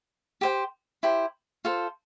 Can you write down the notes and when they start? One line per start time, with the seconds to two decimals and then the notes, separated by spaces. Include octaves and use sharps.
0.41 G4 C5 G5
1.03 E4 G4 C5
1.65 F4 A4 C5